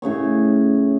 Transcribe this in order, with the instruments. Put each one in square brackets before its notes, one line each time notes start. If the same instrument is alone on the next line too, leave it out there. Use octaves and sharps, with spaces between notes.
[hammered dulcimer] A2 C#3 D#5 C#6